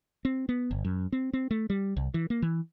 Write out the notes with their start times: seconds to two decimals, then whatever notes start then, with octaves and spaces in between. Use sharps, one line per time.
0.25 C4
0.49 B3
0.71 G1
0.85 F#2
1.12 C4
1.33 C4
1.51 A3
1.70 G3
1.97 C2
2.14 E3
2.30 A#3
2.42 E3